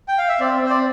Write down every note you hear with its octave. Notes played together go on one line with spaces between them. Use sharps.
G5
F5
E5
C4 D5
C4 C5
D5